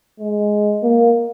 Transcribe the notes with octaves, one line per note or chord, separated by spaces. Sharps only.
G#3
A#3